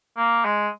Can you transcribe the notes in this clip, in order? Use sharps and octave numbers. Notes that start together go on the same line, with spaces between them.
A#3
G#3